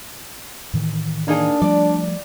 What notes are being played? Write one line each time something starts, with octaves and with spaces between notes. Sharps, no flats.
A2 D#3 E3
A#3 D4 D#4 G#4
F3 G3 A3 D5